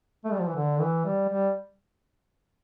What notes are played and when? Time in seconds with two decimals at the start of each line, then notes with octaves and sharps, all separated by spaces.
0.25 A3
0.32 G3
0.40 F3
0.48 E3
0.56 D3
0.81 E3
1.05 G3
1.29 G3